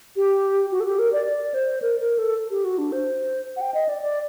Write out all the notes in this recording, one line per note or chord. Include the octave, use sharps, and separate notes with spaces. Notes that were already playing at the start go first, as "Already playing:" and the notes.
G4
F#4
A4
G4
A#4
D5
D5
C5
A#4
A#4
A4
G4
F#4
D4
C5
F#5
G5
D#5
D5
D5